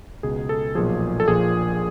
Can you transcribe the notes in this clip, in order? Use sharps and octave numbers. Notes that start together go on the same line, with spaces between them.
C#2 B2 G#4
A4
B1 A#2 F3 G#4
A4
A#1 A#2 F3 G#4